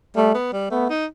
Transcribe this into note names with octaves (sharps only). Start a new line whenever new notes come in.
G3 A3
B3
G3
A3 B3
D#4